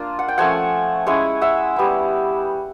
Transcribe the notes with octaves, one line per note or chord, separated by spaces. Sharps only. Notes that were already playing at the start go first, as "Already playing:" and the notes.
Already playing: A#3 D4 F4
F#5
G5
F3 A3 C#4 F#5 G#5
G#3 C#4 E4 F#5 G#5
E5 F#5
G3 B3 E4